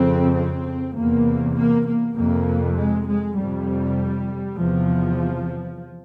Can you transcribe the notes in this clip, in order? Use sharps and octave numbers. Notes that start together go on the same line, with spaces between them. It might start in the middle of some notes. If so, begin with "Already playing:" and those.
Already playing: F2 C#3 C4
C4
E2 C3 A#3
A#3
A#3
F2 C3 A#3
G#3
G#3
F2 C3 G3
E2 C3 F3